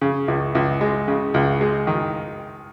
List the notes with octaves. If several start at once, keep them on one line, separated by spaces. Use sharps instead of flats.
C#3
C#2
C#2
G#3
C#3
C#2
G#3
D#3